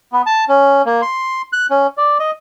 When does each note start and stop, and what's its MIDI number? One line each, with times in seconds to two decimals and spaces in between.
0.13 0.22 59
0.26 0.45 81
0.49 0.82 61
0.86 1.01 58
1.02 1.42 84
1.53 1.66 90
1.71 1.87 61
1.97 2.18 74
2.20 2.31 75